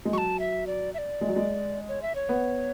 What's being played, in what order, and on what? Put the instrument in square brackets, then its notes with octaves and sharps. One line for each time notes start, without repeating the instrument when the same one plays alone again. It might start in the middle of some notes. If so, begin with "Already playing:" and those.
[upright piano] G#3
[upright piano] F#3 [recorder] C#6
[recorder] A5
E5
D5
E5
D5
[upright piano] G#3
F#3
G#3
[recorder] C#5
E5
C#5
[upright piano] B3